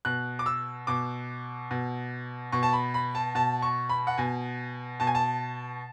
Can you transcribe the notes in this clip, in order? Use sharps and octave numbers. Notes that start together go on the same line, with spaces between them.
B2 F#6
D6
E6
B2 D6
B2
B2 C#6
A5
B5
B5
A5
B2 A5
C#6
B5
F#5
B2 G#5
B2 A5
G#5
A5